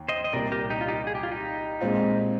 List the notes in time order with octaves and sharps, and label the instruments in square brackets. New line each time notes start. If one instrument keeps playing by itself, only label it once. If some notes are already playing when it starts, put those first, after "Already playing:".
Already playing: [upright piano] D#2
[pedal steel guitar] C5 D#5
D#5
[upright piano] C2 A#2 G3 [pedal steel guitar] A#4 D5
[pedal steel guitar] G4 A#4
D#4 G4
F4
D#4 G4
G#4
G4
F4
D#4 G4
[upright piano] A#2 G#3 C4 F4